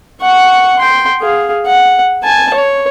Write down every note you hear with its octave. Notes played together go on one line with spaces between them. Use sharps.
F#5 C#6
G5 C6
G#4 F5
F#5
G#5 A5
C#5